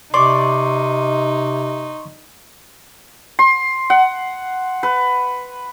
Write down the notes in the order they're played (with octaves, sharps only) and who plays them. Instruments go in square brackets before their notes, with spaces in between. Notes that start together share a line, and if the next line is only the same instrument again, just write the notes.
[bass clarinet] C3 [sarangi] D#4 [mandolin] D5 [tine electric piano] C6 C#6
[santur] C6
F#5
B4